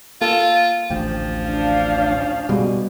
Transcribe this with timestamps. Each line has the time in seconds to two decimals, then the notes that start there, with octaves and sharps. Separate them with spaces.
0.21 A#3 F4 A4 A5
0.90 A1 D2 F3 G5
1.47 D4 F5
2.49 B2 G3 G#3